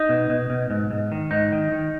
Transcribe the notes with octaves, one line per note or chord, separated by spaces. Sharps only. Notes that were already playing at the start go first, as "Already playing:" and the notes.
Already playing: D#4
B2
B2
B2
G#2
G#2
D#3
G#2 D#4
D#3
D#3